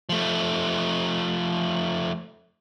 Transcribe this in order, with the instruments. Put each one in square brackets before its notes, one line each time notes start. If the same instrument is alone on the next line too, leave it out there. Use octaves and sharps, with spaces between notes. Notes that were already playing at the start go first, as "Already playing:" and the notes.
[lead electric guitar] F3 A3